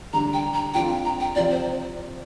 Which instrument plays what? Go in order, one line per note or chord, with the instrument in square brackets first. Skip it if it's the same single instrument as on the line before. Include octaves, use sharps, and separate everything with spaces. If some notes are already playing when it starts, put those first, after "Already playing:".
[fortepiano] D3 G3 D4 [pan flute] A#5
[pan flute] G5
A#5
[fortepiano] F2 F3 D4 F4 [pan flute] G5
[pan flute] G5
A#5
G5
[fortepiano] C3 F3 C4 [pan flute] D5
[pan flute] C5